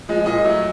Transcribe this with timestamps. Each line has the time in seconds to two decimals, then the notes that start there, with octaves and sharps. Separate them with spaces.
0.09 F3 G#3
0.26 A#2 D#5
0.44 F#3 A3